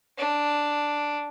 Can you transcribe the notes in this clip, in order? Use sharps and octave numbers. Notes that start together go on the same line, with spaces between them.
D4